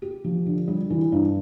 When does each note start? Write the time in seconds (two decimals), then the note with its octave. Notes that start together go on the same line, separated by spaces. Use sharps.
0.02 G4
0.24 F3
0.46 D3
0.68 G3
0.90 E3
1.12 G2